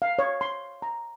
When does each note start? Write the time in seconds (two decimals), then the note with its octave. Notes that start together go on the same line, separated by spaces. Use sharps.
0.02 F5
0.19 C#5
0.41 C6
0.82 A#5